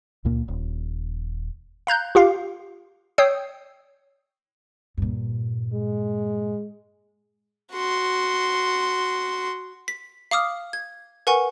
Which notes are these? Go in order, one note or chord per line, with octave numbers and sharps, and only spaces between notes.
C#2 A#2 A#3
D#1
F5 A#5 F#6 G6
F4 G4 F5
C#5 G5 D#6 E6 G6 C7
G2 A#2
G#3
F#4 C6
B6
F5 D6 D#6 F6
G#6
A#4 B4 F#5 G#5 C#6